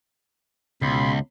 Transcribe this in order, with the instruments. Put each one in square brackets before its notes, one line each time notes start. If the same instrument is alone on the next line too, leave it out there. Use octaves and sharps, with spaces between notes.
[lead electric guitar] C#2 [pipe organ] B2 B5 C6